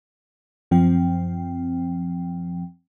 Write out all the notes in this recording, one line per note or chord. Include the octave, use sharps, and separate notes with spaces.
F#2 F3 C4 G5